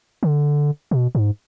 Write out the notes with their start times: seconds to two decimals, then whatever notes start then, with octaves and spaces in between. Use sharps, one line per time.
0.23 D3
0.91 B2
1.15 G#2